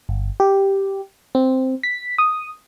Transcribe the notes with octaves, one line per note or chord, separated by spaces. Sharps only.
G1
G4
C4
B6
D#6